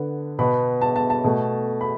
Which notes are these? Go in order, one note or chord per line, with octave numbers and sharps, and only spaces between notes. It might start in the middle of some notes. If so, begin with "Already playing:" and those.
Already playing: D3 B3
B2 B3 B5
A5
A5
A5
B2 A3
B5